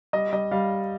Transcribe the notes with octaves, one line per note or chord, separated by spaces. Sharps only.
G3 D#5
G3 D#5
G3 F5